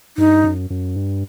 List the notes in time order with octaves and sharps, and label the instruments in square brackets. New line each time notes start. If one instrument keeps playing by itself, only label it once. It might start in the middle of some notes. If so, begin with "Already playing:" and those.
[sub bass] G2 [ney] D#4
[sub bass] F#2
F#2
G2